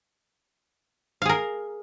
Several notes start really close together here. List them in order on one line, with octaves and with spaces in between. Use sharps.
F5 G#4 A#4